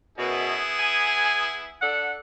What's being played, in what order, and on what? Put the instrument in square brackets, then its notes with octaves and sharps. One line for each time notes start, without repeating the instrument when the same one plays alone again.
[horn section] F#2 B2 [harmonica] B3 E4 G#4
[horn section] G#5
D4 A4 F#5